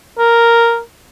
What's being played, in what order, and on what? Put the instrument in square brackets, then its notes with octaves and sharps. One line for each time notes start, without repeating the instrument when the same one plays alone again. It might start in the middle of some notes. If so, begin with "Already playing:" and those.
[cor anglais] A#4